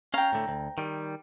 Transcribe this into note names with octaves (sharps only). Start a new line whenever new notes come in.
C#4 F5 G5 A#5
A2 D3 A3
D2
D#3 G3